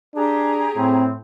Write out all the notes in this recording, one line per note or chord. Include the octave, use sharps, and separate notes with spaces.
D4 G4 G#4 A#5
A2 C4